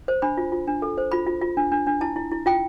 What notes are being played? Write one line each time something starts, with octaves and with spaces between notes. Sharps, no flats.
C5
D4 B5
F4
F4
D4
A4
C5
F4 B5
F4
F4
D4
D4
D4
E4 A5
E4
E4
F4 G5